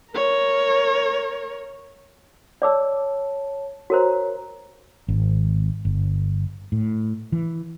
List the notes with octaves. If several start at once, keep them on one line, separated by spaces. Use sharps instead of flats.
A#4 C#5
C#5 D5 A5 D6 E6
F#4 A#4 C5 C#5 A#5
G#1
G1
A2
E3